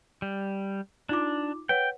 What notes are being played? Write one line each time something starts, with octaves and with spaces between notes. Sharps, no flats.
G3
D4 D#4 F4 D6
B4 C#5 F#5 G5